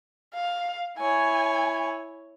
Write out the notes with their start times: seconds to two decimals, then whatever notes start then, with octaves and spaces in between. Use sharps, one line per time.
0.34 F5
0.98 E4 C#5 G#5